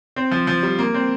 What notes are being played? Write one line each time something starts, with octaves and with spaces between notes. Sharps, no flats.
C4
F3
F3
G3
A#3
C4